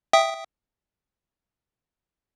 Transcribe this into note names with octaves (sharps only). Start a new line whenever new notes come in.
E5 G5 D#6